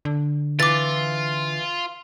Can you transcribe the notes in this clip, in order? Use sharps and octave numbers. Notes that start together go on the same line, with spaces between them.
D3
E3 F4 D6 A6